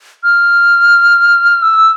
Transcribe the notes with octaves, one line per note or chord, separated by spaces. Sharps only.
F6
E6